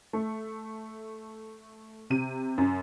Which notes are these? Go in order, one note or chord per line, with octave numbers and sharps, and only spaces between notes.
A3
C3 D#7
F#2